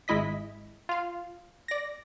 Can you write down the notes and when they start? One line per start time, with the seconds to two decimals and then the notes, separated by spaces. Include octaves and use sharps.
0.08 G#1 G#3 E4 D#5 B6
0.89 F4 F5
1.68 D5 A#6